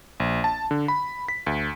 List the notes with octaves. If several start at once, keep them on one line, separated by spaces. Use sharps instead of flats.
A#1
A5
D3
B5
B6
D2